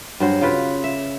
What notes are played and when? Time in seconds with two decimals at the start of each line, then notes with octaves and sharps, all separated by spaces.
0.20 G2 F#3 C5
0.41 C#3 F4 B4
0.84 E5